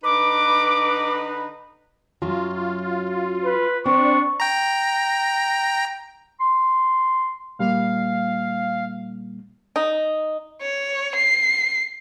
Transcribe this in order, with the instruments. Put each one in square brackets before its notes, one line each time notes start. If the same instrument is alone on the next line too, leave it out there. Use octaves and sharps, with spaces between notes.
[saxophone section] D3 D#4 B4 [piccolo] D6
[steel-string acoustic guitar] F#2 F#3 [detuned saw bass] F4
[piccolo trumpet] B4
[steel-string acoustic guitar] C4 [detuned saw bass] D4 [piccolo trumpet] C#6
[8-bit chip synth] G5 A#5
[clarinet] C6
[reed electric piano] A#2 G3 A#3 [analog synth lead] F5
[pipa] D#4
[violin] C#5
C7